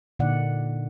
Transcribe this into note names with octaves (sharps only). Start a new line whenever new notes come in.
A#2 D3 A#3 D#4 D5 F#5